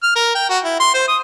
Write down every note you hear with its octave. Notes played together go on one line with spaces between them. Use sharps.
F6
A#4
G5
F#4
E4
C6
C5
D#6